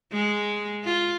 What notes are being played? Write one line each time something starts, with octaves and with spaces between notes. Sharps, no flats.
G#3
F4